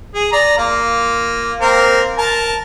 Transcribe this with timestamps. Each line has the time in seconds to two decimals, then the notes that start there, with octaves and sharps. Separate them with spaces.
0.14 G#4
0.32 D5 A#5
0.58 A#3 F4
1.61 A#3 C4 A#4
2.18 A#4 A5